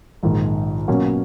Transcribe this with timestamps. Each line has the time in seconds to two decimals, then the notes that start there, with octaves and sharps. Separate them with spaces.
0.23 A#1 G#2 D#3
0.88 B2 F#3 A#3 C#4